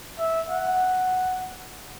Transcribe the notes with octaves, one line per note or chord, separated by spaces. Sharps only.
E5
F#5